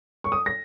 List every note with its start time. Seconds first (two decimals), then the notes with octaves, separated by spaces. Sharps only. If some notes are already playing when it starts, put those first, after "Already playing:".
0.24 C#6
0.32 D#6
0.46 A#6